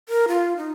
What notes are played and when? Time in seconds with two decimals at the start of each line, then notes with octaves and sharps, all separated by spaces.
0.09 A#4
0.28 F4
0.57 D#4